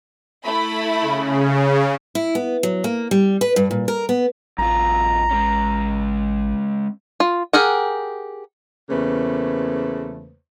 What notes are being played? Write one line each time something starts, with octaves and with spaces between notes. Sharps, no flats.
A3 E4 B5
C#3
E4
B3
F#3
A#3
G3
B4
G2
A#2
A#4
B3
A1 F#2 F4 A#5
G#3 C#4
F4
G4 G#4 A#4 F#5
E2 C#3 A3 A#3 B4 C5